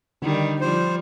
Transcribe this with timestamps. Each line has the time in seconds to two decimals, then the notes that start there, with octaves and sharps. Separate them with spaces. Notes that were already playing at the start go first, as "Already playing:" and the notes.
0.22 D3 D#3 G3 D#4
0.61 F3 G3 C5